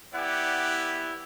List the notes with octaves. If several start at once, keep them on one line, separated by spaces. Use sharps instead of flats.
B3 E4 G4 D5 F#5